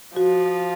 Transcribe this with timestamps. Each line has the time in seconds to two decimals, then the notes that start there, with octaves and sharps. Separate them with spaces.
0.16 F3 F#4